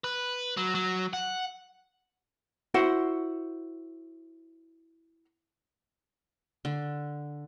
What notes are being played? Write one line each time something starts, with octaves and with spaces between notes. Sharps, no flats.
B4
F#3
F#3
F#5
E4 F#4 C5 F#5
D3